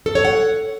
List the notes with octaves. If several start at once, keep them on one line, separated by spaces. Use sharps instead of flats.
A4
C#5
F#5